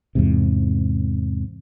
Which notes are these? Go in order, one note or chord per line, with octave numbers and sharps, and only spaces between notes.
E2 G#2 C3